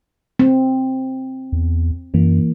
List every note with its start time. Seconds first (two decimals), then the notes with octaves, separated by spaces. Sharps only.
0.39 C4
1.52 E2
2.14 F#2 E3 A#3